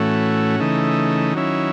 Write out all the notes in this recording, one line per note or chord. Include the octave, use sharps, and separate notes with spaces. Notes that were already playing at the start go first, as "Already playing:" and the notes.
Already playing: A2 E3 A3 C#4 F#4
C#3 E3 A3 D#4
D#3 F#3 C#4 E4